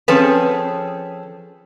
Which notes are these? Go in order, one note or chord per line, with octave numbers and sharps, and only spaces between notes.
F3 C4 C#4 G#4 A4 B4